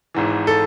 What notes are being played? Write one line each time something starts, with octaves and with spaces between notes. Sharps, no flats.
G#1 G#2 E3
A4